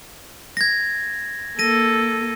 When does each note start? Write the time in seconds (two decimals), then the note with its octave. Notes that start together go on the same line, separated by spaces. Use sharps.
0.57 G#6 A#6
1.59 A#3 A4 A#6 D#7